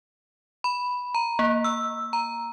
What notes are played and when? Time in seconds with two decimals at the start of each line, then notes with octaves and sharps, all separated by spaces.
0.64 B5
1.15 A#5
1.39 A#3
1.64 E6
2.13 A#5